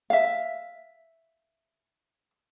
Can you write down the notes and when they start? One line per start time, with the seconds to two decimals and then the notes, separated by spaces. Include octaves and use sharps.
0.10 E5 F5